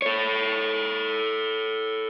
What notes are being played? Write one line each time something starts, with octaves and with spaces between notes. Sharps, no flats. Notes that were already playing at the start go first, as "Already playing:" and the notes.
A4 C#5